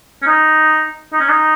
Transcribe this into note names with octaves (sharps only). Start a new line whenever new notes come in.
C#4
D#4
D#4
C#4
D#4